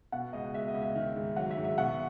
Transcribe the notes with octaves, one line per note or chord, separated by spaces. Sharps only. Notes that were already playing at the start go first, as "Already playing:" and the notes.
B2 F#5
C#2 D#5
G#3 E5
D#5
C#2
E5
D#3
G#2
F#3 F#5
E5
G#2
E5
B2 F#5